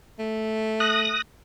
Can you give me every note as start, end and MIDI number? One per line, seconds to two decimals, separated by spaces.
0.19 1.17 57
0.80 1.22 87
0.80 1.22 90
0.80 1.22 94